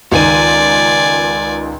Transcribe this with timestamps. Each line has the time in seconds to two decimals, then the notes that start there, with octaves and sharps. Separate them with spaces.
0.12 C#2 D#3 D5 G#5 D#7